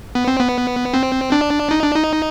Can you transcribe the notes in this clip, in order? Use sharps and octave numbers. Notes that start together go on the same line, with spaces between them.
B3
C4
B3
C4
D4
D#4
D4
D#4